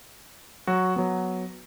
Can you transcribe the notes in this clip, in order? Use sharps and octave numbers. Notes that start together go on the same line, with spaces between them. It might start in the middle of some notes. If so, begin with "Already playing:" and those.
F#3 F#4
F#3 B3